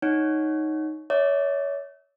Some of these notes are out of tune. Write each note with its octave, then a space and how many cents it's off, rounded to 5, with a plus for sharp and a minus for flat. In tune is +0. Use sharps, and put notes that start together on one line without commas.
D#4 +0 C#5 +0 F#5 +0
C#5 +25 E5 -30 D6 +5